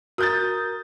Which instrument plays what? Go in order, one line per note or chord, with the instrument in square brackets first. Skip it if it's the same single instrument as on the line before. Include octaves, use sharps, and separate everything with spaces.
[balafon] F#4 [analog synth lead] A#4 [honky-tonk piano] D#6 G6 A6